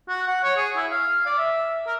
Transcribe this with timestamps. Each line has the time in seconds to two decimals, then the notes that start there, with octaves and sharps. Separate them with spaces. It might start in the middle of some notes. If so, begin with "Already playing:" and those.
0.08 F#4
0.27 F#5
0.44 C#5
0.57 G#4
0.76 E4
0.91 F5
1.26 D5
1.38 E5
1.87 A#4